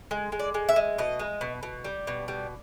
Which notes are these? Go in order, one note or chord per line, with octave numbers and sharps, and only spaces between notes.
G#3
G#3
D5
G#3
E5
G#3
B2 D#5
G#3
B2
B2
G3
B2
G3